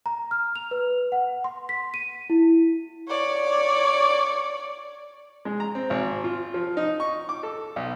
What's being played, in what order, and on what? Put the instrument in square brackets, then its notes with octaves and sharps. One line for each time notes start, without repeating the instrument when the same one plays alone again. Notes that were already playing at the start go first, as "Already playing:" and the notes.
[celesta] A#5
F6
F7
B4
F#5
C6
B6
D#7
E4
[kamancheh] C#5 D5
[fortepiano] G#3
A#5
C4
G#1
F4
F3
D#4
C#6
D6
A4
B1